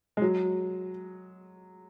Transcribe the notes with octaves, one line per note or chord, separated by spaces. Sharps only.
G#3
F#3